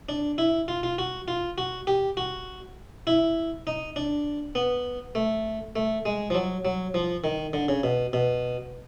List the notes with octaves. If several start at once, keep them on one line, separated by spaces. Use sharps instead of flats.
D4
E4
F4
F4
F#4
F4
F#4
G4
F#4
E4
D#4
D4
B3
A3
A3
G#3
F3
F#3
F#3
F3
D#3
D3
C#3
B2
B2